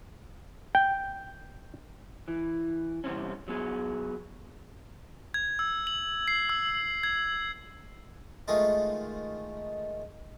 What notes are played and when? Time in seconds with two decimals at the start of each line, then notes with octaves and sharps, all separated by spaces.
0.75 G5
2.28 E3
3.04 E2 G2 C3 C4 C#4
3.48 F#3 B3 G#4
5.34 G#6
5.59 E6
5.87 F#7
6.28 C7
6.49 E6
7.03 G#6
8.48 D#3 G#3 A3 D#4 F4